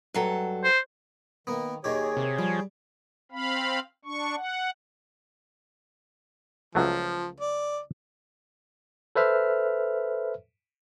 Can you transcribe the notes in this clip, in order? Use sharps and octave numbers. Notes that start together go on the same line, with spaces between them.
G2 F#3 A4
C5
D#3 A#3 B3
D#2 D#3 G4 G#4 C#5
C3
F3 G3
C4 F5 B5
D4 C#6
F#5
C#2 F3 F#3 A3
D5
A4 B4 C5 E5 F6